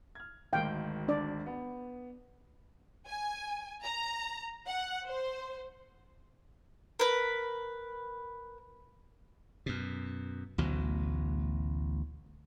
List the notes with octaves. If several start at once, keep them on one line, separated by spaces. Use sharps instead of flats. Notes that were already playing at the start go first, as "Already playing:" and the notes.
F6 G#6
G#1 D2 D#3 F5 G5
D4 D5
B3
G#5
A#5
F#5
C5
A#4 B4
F#2 B2
A1 D2 B2 F#3